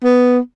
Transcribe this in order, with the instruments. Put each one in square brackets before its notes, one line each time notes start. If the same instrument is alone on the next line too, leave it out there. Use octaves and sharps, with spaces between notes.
[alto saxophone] B3